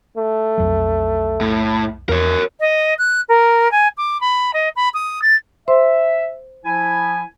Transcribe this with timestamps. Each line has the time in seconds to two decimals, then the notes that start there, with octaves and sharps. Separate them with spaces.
0.17 A3
0.58 B1 F2 F#3
1.41 A2
2.09 E2 A#4 C#5
2.60 D#5
2.98 F#6
3.28 A#4
3.71 G#5
3.97 D6
4.20 B5
4.53 D#5
4.76 B5
4.94 D#6
5.22 A6
5.68 C5 E5 C6
6.65 F3 E4 G#5